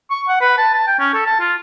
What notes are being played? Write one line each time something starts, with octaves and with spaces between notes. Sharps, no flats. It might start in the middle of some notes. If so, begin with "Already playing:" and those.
C#6
F#5
B4
A5
A5
G5
C#4
A4
A5
F4